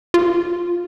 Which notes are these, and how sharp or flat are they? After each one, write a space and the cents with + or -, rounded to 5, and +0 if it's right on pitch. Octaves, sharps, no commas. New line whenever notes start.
F4 +5